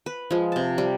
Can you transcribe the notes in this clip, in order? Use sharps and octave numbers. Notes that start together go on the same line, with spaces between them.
B4
F3 G#3
C3 A5
G3